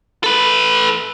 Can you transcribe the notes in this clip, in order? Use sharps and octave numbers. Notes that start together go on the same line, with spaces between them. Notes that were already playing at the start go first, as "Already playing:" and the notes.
A4 B4